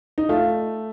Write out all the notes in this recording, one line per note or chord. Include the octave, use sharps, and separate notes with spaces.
D#4
A3 F4